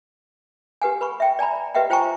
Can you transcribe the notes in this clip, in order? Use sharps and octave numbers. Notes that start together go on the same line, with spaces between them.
G4 B4 F#5 G#5
B4 B5 C#6
E5 G5
D5 G#5 A#5 B5
G4 B4 D#5 E5 F#5 G5
F4 C5 G5 G#5 A#5 C#6